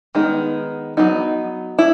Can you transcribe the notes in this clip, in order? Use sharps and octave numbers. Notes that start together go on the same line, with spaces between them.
D#3 G#3 B3 D#4
F#3 B3 D#4
E4